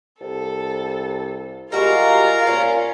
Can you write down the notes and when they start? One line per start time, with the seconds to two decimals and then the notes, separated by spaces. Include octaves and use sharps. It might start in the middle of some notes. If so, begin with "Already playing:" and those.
0.21 C2 A4
1.72 G3 G#3 F4 F#4 A#4 F5 A#5
2.47 A#2 C#4